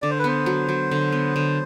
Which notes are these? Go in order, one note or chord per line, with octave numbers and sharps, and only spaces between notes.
D3 D5
C5
B4
B3 C5
F#3
F#3
D3
B3
D3